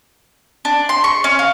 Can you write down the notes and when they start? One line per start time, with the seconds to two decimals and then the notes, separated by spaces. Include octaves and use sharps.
0.65 D4
0.89 C6
1.04 C#6
1.24 C#4
1.39 F5